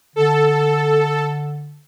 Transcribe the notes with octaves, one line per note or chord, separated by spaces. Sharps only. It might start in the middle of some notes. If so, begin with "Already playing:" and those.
D3 A4